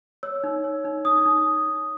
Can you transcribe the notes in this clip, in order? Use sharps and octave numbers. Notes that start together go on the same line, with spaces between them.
C#5 E6
D#4
C#5
D#4
D#4 D#6
D#4